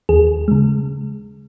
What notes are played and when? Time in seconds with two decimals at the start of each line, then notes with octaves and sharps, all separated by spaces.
0.09 D#2 G#4
0.48 C#3 G#3